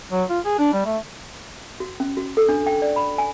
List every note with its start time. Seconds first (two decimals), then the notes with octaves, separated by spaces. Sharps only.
0.12 F#3
0.30 F4
0.45 G#4
0.59 D4
0.73 G3
0.86 A3
1.80 F#4
2.00 C#4
2.17 F#4
2.37 A4
2.49 D4
2.66 G5
2.82 D5
2.96 B5
3.18 G#5